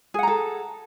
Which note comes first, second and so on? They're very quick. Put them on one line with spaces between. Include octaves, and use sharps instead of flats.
G#4 F#5 A#5 A4